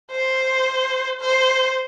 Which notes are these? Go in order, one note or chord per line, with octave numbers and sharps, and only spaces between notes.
C5
C5